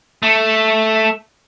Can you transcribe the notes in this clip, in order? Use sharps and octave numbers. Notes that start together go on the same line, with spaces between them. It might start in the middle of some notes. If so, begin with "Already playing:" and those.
A3